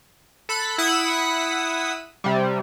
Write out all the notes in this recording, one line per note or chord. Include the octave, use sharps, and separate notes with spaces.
A4 B5 F#6
E4 F#5 D#6 E6 B6
C3 G3